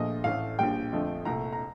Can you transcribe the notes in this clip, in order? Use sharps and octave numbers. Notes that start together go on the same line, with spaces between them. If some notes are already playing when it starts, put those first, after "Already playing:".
Already playing: A#1 A#2 F3 A3 D#5
A1 A2 A3 F5
A#1 A#2 G3 G5
F2 D3 F3 A3
C2 A#2 A3 A#5
A#5